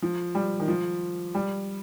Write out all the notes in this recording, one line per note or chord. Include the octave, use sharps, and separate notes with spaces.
F3
G3
D#3
F3
G3